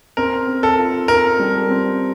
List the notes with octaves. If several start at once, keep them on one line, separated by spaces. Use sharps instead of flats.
C4 A#4
C4
A4
F4
C4 A#4
G3
C4